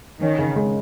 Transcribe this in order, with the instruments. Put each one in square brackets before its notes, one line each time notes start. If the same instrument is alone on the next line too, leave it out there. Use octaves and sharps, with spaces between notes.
[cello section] D#3 [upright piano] C#4
[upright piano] C#3
G#3